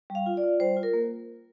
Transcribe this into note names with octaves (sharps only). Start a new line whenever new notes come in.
G3
F5
F4
D5
F4
G3 C5
F4
A#4
A#3